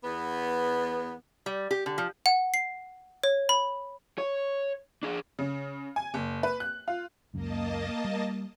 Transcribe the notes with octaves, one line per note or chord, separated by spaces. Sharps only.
E2 B3
G3
G4
D3
F3
F#5
C7
C#5
B5
C#5
D4 G#4
C#3
G#5
F#1
B4
F#6
F4
C#2 F#2 A#3 D#5 A5
G3